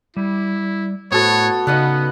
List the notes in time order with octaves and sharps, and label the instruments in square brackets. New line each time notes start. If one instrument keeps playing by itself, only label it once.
[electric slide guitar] G3 [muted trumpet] E4
[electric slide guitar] A2 C5 [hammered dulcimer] B3 F#4 A4 [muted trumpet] C#5
[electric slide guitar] C#3 D#4 [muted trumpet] B3 [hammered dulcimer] D#5 F5 F#5